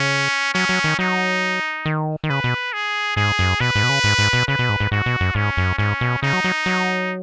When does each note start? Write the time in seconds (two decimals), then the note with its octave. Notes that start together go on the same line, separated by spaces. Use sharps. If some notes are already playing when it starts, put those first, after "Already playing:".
Already playing: C#3 C#4
0.54 F#3 C#4
0.69 F#3
0.84 D#3
0.99 F#3 D#4
1.86 D#3
2.24 D#3
2.30 C#3 B4
2.44 B2
2.73 G#4
3.17 G#2 G#4
3.39 F#2
3.60 B2 B4
3.75 G#2
3.83 B2
3.89 C#3
4.04 G#2
4.18 G#2
4.33 B2
4.48 C#3 B4
4.59 B2
4.69 G#2
4.80 G#2
4.91 G#2 F#4
5.06 B2
5.20 F#2
5.35 G#2 C#4
5.57 F#2
5.78 G#2 C#4
6.01 B2
6.22 C#3 D#4
6.33 F#3
6.44 F#3
6.66 F#3